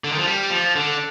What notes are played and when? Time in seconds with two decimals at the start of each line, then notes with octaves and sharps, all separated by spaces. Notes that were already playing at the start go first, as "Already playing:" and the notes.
0.04 D3
0.12 D#3
0.18 F3
0.27 G3
0.50 F3
0.76 D3